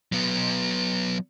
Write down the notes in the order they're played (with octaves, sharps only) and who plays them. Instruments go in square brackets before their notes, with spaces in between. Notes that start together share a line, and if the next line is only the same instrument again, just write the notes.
[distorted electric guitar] F#3 B3